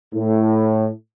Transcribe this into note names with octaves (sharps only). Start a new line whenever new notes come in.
A2